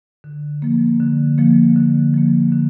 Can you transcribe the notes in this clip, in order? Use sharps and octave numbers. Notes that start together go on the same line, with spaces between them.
D3
F3 A#3
D3
F3 A#3
D3
F3 A#3
D3